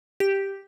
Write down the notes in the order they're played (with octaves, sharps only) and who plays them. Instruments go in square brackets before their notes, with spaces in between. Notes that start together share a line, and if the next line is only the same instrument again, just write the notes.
[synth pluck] G4